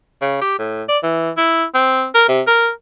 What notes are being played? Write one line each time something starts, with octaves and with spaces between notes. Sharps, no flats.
C#3
G4
A2
D5
E3
E4
C4
A#4
C3
A#4